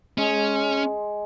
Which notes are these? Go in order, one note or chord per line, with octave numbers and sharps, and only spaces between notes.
G#3 C#4